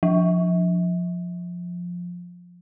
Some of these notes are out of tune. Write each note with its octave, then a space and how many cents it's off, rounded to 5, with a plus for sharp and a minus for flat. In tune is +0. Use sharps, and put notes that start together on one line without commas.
F3 +15